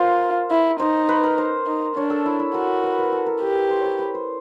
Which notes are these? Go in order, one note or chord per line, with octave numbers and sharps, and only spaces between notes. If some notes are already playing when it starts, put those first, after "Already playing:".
Already playing: F4 A#4 C5
E4
D#4 C5
B4
A#4
C5
D#4
D4 C#5
A4
E4
E4
F#4 A#4
B4
A#4
A4
A#4
G4 B4
C5
C5 C#5
B4
C5